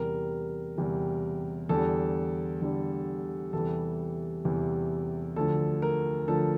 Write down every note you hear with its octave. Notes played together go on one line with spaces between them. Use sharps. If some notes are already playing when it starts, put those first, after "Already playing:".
Already playing: E2 C3 G3 A#4
E2 C3 G3
E2 D3 G3 A4
E2 D3 G3
E2 C3 E3 G3 A4
E2 C3 E3 G3
D2 D3 F3 A4
A#4
D2 D3 F3 A4